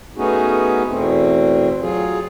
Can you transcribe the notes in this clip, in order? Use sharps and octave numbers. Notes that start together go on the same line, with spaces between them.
A3 B3 C#4 D#4 F#4 G#4
E2 B2 A3 C4
F#3 F4 G#4